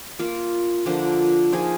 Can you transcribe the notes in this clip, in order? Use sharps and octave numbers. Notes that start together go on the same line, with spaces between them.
A#3 F4 A#4
D3 F3 A#3 D4
F3 A#3 D#4 G#4